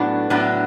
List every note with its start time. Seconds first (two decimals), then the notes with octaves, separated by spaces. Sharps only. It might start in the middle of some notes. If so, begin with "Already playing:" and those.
Already playing: A2 F#3 B3 D4
0.30 A2 F#3 B3 D4